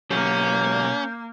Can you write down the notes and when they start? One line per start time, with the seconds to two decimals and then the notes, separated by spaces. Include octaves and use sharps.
0.11 B2 F#3 A#3 C#4 G4 G6